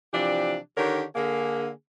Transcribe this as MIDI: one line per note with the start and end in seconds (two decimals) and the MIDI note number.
0.12 0.56 48
0.12 0.56 52
0.12 0.56 53
0.12 0.56 62
0.12 0.56 67
0.12 0.56 74
0.76 1.02 50
0.76 1.02 51
0.76 1.02 62
0.76 1.02 67
0.76 1.02 70
0.76 1.02 73
1.15 1.69 50
1.15 1.69 58
1.15 1.69 68